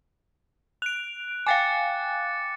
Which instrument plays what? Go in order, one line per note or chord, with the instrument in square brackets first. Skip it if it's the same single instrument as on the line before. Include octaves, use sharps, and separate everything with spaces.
[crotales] F#6 [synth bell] D7 F7
[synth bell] F5 G5 G#5 [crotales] D6 A6 C#7